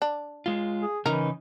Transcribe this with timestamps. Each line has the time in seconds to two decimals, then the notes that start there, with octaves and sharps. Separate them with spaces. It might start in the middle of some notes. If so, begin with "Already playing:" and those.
0.02 D4
0.46 G#3 F4
0.82 G#4
1.06 C#3 E3 D#4 A#4